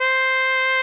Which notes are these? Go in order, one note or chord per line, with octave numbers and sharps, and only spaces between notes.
C5